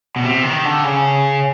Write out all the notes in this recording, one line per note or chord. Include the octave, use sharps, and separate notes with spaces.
B2
C3
D#3
D3
C#3